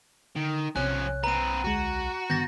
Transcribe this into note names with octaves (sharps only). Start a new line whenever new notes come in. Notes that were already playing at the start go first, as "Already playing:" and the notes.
D3 D#3
B1 C3 F3 C#4 C#5 G#5 F#6
C4 B4 A#5 D#7
D2 G#3 F#4
G2 D3 D#3 B3 G6 A6 A#6